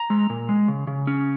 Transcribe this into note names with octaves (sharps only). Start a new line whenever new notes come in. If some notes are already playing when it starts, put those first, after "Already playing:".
Already playing: A#5
G#3
A#2
G#3
C#3
C#3
C#4